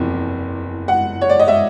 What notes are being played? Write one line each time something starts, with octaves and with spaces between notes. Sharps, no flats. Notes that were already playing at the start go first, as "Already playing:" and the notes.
Already playing: F#1 E2 C3 F3
F#5
C#5
D5
D#5
E5